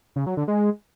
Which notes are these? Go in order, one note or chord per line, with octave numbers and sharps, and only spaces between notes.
C#3
F#3
D3
G#3